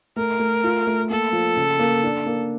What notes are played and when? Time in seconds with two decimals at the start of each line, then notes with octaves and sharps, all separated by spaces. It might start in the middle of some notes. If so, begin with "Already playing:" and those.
0.16 A3 A#4
0.39 A3
0.64 F4
0.87 A3
1.10 A#3 A4
1.33 F3
1.56 C#3
1.79 A#3
2.03 D4
2.26 A#3